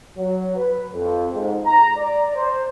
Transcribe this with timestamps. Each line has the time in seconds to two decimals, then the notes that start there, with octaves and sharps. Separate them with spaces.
0.17 F#3
0.56 B4
0.93 F2
1.33 G#2
1.66 A#5
1.97 D5
2.35 C5